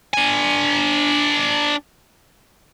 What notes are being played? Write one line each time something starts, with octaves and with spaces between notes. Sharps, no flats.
D4 G#5